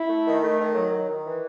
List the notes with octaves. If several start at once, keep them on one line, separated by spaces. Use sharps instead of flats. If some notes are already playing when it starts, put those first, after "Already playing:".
Already playing: E4
A3
D#3
A3
D#3
F#3
D#3
D#3
E3